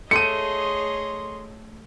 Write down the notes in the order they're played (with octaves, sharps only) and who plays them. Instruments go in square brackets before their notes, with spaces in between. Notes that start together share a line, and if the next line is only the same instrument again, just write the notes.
[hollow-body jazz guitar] A3 A4 [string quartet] G#4 C#5 D#5 [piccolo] C6 [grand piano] C#7 D#7